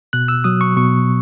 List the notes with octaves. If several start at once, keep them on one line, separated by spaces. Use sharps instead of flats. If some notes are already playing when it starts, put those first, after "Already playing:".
B2 F#6
E6
F#3 D#6
C#6
B2 C#6